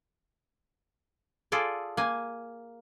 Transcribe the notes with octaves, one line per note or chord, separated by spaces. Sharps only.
F4 G#4 A4 D5
A#3 G#5